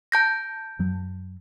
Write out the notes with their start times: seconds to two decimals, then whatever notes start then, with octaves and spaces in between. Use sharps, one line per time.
0.12 A5 G6 A#6
0.79 F#2 F#3